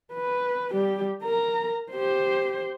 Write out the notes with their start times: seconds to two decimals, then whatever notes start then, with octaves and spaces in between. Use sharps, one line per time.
0.13 B4
0.73 G3 G4
1.23 A#4 A#5
1.92 G4 C5